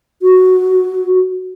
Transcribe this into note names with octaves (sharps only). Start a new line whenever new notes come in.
F#4